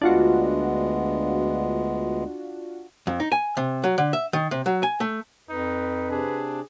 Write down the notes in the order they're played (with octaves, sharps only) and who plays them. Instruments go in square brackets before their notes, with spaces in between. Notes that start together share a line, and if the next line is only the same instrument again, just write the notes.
[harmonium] D2 G#3 B3 [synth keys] D4 F4 F#4
[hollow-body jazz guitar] F2
D#4
G#5
C3
F#3
D3
E5
D#3
C3
F#3
G#5
A3
[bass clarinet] F2 [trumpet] D#4 [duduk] B4
[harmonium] C3 D4 [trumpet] G#4